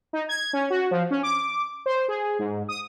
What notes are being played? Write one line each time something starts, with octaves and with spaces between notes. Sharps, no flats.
D#4
G#6
C#4
F#4
F3
C#4
D6
C5
G#4
G#2
D#6